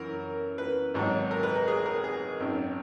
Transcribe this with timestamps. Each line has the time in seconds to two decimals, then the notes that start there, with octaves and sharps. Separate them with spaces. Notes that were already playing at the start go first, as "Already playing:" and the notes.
Already playing: F#2 E3 A#4
0.58 B4
0.94 G#1 G#2 F#3
1.31 A#4
1.43 B4
1.56 A#4
1.68 G#4
1.86 A#4
2.04 G#4
2.40 G#1 F#2 D#3